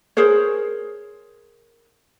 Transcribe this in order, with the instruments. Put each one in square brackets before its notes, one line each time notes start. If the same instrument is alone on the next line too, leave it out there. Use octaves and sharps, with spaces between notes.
[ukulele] G#4 A#4 C5 C#5